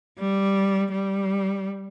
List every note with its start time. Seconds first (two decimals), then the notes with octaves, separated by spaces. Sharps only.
0.19 G3
0.92 G3